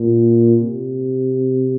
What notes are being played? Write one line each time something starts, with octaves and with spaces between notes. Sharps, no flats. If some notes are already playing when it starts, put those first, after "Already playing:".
Already playing: A#2
C3